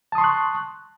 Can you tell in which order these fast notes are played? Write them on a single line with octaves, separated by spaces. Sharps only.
A5 D#6 C6 C#6 F#6